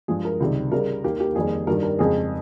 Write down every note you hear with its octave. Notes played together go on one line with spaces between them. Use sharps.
G2 F3 G#3 G#4
A#4
C#2 C3 D#3 G3
C#2 C#3 G3 A#4
D#2 D#3 A#3 G4
G4
F2 D#3 G3 A#3 G#4
G2 D#3 G3 A#4
A#4
F2 C#3 G#3 C4 G#4